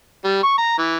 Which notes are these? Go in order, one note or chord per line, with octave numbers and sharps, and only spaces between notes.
G3
C#6
A#5
E3